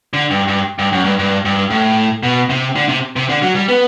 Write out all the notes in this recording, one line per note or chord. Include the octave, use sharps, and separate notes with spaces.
D3
G2
G2
G2
F#2
G2
G2
G2
A2
B2
C3
D3
C3
C3
D3
F#3
G3
B3